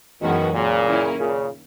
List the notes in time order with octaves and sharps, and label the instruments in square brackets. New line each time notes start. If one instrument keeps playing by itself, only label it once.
[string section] F#2 E3 G#3 C#4 F#4 [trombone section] B2 D#3
[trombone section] A#2 C#3
[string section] D#3 A#3 C#4 E4 A#4
[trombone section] A#2 C#3